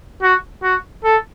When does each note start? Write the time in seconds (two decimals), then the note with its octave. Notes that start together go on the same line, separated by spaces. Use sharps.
0.22 F#4
0.63 F#4
1.04 A4